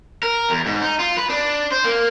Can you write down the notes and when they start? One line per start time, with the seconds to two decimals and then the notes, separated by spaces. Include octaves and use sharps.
0.23 A#4
0.50 E2
0.66 G#2
0.81 D#4
0.99 F4
1.17 B4
1.29 D4
1.72 C5
1.85 A#3